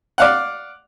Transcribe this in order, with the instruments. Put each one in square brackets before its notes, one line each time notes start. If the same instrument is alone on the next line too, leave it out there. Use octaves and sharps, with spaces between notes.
[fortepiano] D5 F5 F#5